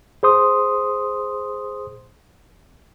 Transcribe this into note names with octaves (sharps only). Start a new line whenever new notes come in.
G#4 C5 C6 D#6